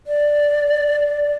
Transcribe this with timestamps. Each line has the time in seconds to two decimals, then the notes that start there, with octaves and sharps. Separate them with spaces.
0.07 D5